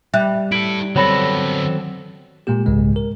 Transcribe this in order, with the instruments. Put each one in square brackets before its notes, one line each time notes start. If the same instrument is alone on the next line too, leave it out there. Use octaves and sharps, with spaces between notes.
[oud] G3 [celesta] E5 F#6
[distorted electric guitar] E4 A4 [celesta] D7
[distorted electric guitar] D3 B3 [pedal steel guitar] F#3 C4 A4 [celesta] C#5 B5 A#6
[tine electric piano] A#2 G#3 A#3 G4
C2 G#2 C#3 G#3
A#4